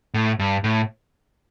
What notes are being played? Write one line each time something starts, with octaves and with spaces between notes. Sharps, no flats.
A2
G2
A2